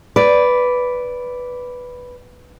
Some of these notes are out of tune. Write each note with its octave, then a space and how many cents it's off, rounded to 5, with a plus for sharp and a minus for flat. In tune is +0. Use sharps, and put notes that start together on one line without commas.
B4 +0 D5 -10